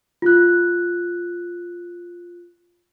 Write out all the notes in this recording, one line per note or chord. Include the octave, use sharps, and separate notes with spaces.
F4 F#6